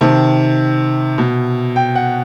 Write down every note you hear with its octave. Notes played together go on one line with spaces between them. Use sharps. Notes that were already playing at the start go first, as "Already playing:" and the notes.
C3 D#3 A5
B2
G5
F#5